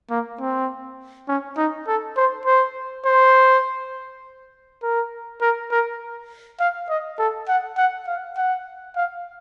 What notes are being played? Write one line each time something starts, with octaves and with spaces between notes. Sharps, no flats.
A#3
C4
C#4
D#4
A4
C5
C5
C5
A#4
A#4
A#4
F5
D#5
A4
F#5
F#5
F5
F#5
F5